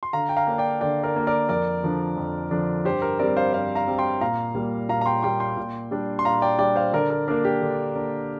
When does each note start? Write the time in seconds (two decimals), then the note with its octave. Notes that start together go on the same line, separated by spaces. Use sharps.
0.03 C6
0.13 D3 F5 A#5
0.29 G5
0.37 F5 A#5
0.47 A#3 D4
0.58 D5 G5
0.81 D3 D5 G5
1.03 A#4 D5
1.15 A#3 D4
1.27 A#4 D5
1.49 F2 A#4 D5
1.83 D3 F3 D4
2.17 F2
2.51 D3 F3 D4
2.85 G2 G4 C5
3.02 A#4
3.19 G3 C4 A#4 D5
3.37 C5 F5
3.53 G2 C5 F5
3.75 F5 A#5
3.88 G3 C4
3.98 G5 C6
4.21 A#2 F5 A#5
4.55 G3 A#3
4.89 A#2 F5 A#5
5.01 A#5
5.06 G5 C6
5.23 G3 A#3 G5 C6
5.40 G5 C6
5.57 A#2
5.91 G3 D4
6.19 C6
6.25 A#2 F5 A#5
6.42 D5 G5
6.59 G3 D4 D5 G5
6.76 C5 F5
6.93 D3 A#4 D5
7.10 A#4
7.28 A#3 D4 A#4
7.45 G4
7.61 D3
7.96 A#3 D4